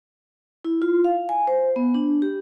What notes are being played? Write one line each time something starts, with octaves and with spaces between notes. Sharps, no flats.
E4
F4
F5
G#5
C5
B3
D4
G4